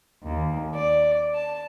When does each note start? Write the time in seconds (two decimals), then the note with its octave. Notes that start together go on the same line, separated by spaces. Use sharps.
0.22 D#2
0.75 D5
1.34 A5